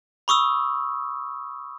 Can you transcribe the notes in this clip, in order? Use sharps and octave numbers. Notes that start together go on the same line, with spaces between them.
B5 C#6 D#6 E6